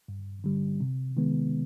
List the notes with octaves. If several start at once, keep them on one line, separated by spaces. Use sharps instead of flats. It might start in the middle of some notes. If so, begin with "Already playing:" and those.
G2
D3 G3
C3
D#3 G#3 B3